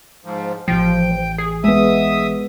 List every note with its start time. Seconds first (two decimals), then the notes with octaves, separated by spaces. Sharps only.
0.25 G#2 F3
0.68 A1 F3 G5
1.38 G#4
1.64 G#3 B3 E5 D#6